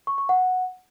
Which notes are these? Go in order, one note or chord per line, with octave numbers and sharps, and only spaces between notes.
C#6
C#6
F#5